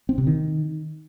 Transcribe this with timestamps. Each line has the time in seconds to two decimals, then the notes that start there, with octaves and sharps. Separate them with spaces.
0.09 C4
0.18 C3
0.27 D#3